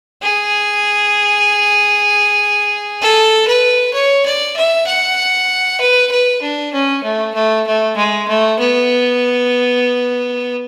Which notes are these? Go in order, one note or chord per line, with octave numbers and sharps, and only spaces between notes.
G#4
A4
B4
C#5
D5
E5
F#5
B4
B4
D4
C#4
A3
A3
A3
G#3
A3
B3